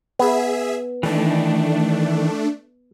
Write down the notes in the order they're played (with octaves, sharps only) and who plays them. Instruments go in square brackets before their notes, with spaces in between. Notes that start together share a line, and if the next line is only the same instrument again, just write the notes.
[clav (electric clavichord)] B3 [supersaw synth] G#4 E5
[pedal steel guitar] D#3 E3 [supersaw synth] A3 D4